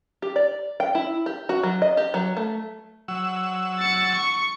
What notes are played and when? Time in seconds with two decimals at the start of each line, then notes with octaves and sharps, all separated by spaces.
0.22 G4
0.36 D5
0.80 G5
0.95 E4
1.26 G4
1.49 F#4
1.63 F#3
1.82 D#5
1.97 G4
2.14 F#3
2.37 A3
3.08 F#3 E6
3.79 A6 C#7
4.14 C#6